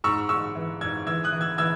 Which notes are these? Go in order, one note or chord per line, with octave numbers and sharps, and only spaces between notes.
G#2 C#6 E6
G#2 C#6 E6
E3
G#2 E6 G#6
E3 E6 G#6
D#6 F#6
E3
E6 G#6
E3 E6 G#6